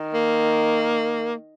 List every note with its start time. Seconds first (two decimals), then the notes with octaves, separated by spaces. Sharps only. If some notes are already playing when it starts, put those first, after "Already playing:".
Already playing: D#3
0.14 A#3